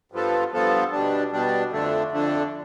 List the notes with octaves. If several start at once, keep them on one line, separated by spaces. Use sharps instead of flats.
G2 F3 B3 F4 A4
G2 F3 B3 F4 A4
B2 G3 D4
B2 G3 D4
F2 D3 A3 D4
F2 D3 A3 D4